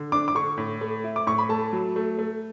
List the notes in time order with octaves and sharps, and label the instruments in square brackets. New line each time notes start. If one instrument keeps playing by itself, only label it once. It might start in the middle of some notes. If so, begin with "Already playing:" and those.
Already playing: [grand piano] D3
[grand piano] D4 [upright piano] D6
[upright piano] D6
[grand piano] D3 [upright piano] C#6
[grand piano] A2
A3
E4
[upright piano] D6
[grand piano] A2 [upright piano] C#6
[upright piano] B5
[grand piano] A3 [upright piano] A5
[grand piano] F#3
A3
A3